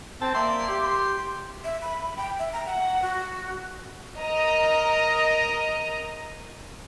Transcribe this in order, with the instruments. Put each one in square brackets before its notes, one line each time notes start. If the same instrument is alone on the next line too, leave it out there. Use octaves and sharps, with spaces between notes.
[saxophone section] C4 [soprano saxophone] A5
[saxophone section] A#3 D5 E5 [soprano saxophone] C6
[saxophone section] G4
[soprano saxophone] C6
[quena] E5
B5
G5
E5
A#5
F#5
F#4
[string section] A#4 D#5 A#5